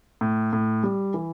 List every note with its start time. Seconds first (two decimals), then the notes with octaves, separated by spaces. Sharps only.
0.21 A2
0.53 A2
0.83 G3
1.14 E3